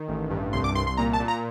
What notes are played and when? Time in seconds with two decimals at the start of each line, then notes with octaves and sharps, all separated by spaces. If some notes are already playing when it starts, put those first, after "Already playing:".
Already playing: D#3
0.08 A1
0.30 G2
0.53 C2 C6
0.64 D6
0.75 C2 C6
0.87 C6
0.97 A#2 A#5
1.13 A5
1.20 A#2
1.28 A#5